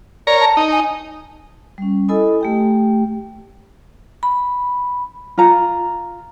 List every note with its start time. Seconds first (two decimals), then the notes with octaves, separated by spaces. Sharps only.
0.27 A#4 C#5 D5 A#5
0.40 A5
0.57 D#4
0.72 G#5
1.78 G3 C#4
2.08 E4 A4 D#5 G#5 B5 D#6
2.41 A3 G4 G5
4.23 B5
5.38 F4 A#5